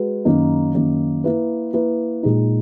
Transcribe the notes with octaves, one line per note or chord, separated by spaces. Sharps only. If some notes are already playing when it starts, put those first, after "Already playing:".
Already playing: G#3 F#4 B4
F#2 D#3 A#3 D#4
F#2 D#3 A#3 D#4
A#3 E4 B4
A#3 E4 B4
A#2 G#3 D#4